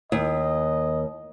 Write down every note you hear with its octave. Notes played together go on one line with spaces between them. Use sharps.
D#2 D#5